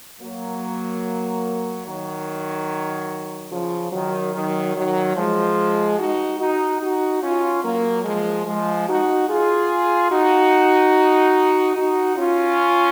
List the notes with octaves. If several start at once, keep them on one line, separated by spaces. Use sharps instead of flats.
F#3 A#3
D#3 F#3
C#3 F3
D#3 F#3
D#3 F#3
D#3 F#3
F3 G#3
D#4 F#4
D#4 F#4
D#4 F#4
C#4 F4
F#3 A#3
F3 G#3
F3 G#3
D#4 F#4
F4 G#4
D#4 F#4
D#4 F#4
C#4 F4